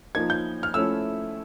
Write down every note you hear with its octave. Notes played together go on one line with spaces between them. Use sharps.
F3 A#3 D#4 G#6
G6
F6
F3 A3 C#4 E4 E6